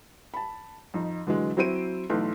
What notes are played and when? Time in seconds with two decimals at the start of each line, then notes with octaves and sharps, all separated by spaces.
0.34 A5 B5
0.94 F2 D#4
1.27 D3 E3 F#3 G#3
1.57 F#3 C4 E4 C5 D7 D#7
2.10 B1 E3 A3 B4 C6